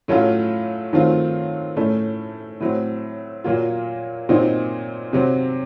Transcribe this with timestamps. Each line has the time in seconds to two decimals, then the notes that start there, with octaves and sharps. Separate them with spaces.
0.08 A2 F#3 A3 C#4 F4
0.93 D#3 F#3 A3 C4 F4
1.76 A2 A3 C#4
2.60 A2 F#3 C4
3.44 A#2 F#3 A#3 F4
4.29 A#2 F#3 C4 D#4
5.13 C3 F#3 C4